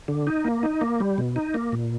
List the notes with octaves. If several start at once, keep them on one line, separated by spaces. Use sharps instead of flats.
D3
D#4
A#3
D#4
A#3
G3
B2
D#4
A#3
A#2